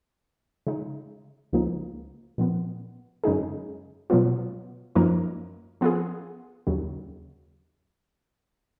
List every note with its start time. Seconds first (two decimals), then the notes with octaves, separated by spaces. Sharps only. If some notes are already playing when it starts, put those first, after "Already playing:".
0.67 C#3 G#3 D#4
1.53 C#2 C#3 F3 A#3 D#4
2.38 A#2 F3 B3
3.24 F#2 C#3 G#3 D#4 G#4
4.10 B2 F#3 B3 F4
4.95 F#2 F3 A#3 D#4 A#4
5.81 F3 B3 F4 G#4
6.67 D#2 C#3 F#3